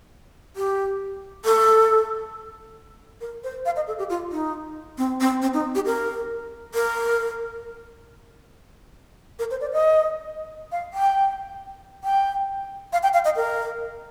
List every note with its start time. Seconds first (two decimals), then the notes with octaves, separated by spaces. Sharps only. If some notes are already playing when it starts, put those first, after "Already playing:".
0.56 G4
1.45 A4
3.21 A#4
3.44 C5
3.65 F5
3.76 D#5
3.87 A4
3.98 G4
4.10 F4
4.32 D#4
4.98 C4
5.20 C4
5.42 C4
5.54 D#4
5.75 G4
5.86 A#4
6.74 A#4
9.39 A#4
9.51 C5
9.61 D5
9.72 D#5
10.72 F5
10.93 G5
12.04 G5
12.93 F5
13.03 G5
13.13 F5
13.25 D#5
13.36 A#4